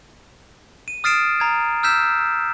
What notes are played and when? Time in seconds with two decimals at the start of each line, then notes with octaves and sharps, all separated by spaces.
0.88 D#7
1.04 D#6 F6 A6 C7 D7 E7
1.40 A#5 G#6
1.83 E6 F6 G6 B6 E7